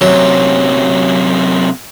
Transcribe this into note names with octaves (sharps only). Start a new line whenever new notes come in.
F#2 C3 F#3